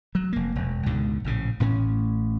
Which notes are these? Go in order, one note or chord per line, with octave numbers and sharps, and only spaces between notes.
F#3
F1 A#3
E1
C#2 G#2 B2 D3
A#1 A2 C#3
A1 A2 C#4